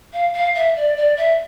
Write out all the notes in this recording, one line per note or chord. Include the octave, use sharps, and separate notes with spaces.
F5
F5
E5
D5
D5
E5